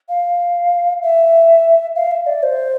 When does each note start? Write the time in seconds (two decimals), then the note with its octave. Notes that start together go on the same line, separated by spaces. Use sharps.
0.09 F5
1.02 E5
1.95 F5
2.11 E5
2.26 D5
2.43 C5